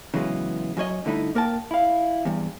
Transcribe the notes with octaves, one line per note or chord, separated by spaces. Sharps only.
C#3 E3 F#3 G#3 B3
F#2 F#3 C#5 D#5
G2 D3 A3 D#4 E4
A#3 A#4 G5 A5
E4 F5
E2 G2